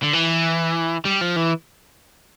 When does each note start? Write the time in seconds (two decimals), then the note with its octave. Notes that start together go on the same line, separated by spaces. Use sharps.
0.03 D3
0.13 E3
1.05 G3
1.21 F3
1.36 E3